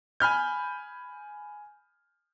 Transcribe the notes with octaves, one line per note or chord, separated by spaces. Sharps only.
G#5 B5 F6 G6